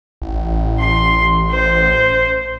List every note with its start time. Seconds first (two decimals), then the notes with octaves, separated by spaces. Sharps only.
0.22 A1
0.79 C6
1.50 C5